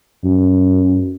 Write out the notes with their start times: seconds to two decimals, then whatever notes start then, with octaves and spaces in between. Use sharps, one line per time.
0.24 F#2